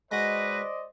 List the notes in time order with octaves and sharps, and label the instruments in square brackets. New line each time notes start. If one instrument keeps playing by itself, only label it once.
[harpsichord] G#3 F#4 [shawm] B4 [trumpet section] C5 D5 D#5 [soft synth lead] A#6